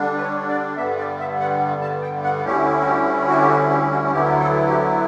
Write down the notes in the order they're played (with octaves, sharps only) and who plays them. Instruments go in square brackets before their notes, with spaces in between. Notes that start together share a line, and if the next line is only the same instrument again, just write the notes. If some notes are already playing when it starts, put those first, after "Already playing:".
Already playing: [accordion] D3 G3 D4
B4
C#5
D5
G2 D3 G3 B3 E5
D5
E5
F#5
A5
G5
F#5
D2 D3 G3 C#4 E4 G4
F#4
G4
F#4
G4
F#4
G4
F#4
D2 D3 F#3 B3 E4 G4
A4
G4